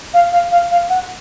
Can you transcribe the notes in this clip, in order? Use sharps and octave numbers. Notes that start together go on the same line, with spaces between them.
F5
F5
F5
F5
F#5